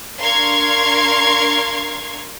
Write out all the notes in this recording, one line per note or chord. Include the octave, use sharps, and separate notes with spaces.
D4 A#4 F5 C6 C#6 G#6